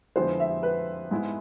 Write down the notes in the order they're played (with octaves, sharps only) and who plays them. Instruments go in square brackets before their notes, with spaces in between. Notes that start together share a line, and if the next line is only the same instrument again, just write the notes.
[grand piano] F2 D3 G#3 B3 E4 [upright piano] C5
[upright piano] E5
B4
[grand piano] G#2 G#3 B3 E4